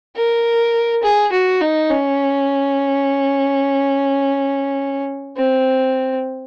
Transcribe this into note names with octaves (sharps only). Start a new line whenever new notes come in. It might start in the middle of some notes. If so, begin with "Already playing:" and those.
A#4
G#4
F#4
D#4
C#4
C4